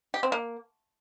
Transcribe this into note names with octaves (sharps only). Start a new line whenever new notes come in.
G4
C4
A#3